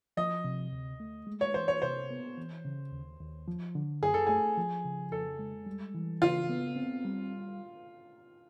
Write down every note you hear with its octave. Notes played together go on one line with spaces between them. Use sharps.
F3 D#5
C3
D2
A3
G#3
C#5
E3 C5
C#5
C3 C5
B3
E3
C#3
D#2
D#2
F3
D3
F#2 G#4
A4
A3 G#4
F3
C#3
F2 A4
G#3
G3
E3
C#3 F4
B3
C4
G3